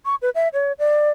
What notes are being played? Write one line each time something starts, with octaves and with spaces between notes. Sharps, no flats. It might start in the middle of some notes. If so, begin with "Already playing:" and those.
C#6
B4
E5
C#5
D5